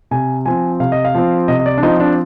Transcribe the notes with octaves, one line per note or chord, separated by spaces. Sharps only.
C3 G#5
F3 C4 G#5
C3 F5
D#5
F5
F3 C4
C3 D#5
D#5
D5
D4
F3 C4 D#4
D4